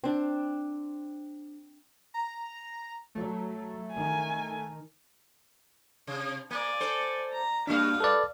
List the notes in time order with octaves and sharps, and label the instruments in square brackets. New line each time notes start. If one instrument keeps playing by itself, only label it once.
[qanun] C4 D4
[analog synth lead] A#5
[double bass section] F#3 [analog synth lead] A3
[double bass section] D#3 [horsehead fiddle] G#5
[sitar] C3
[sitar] A#3 [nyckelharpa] D5 G#5
[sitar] A4 C5
[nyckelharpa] A#5
[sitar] G2 G3 F#4 [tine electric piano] A#3 D4 [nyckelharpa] F5
[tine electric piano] A4 B4 D5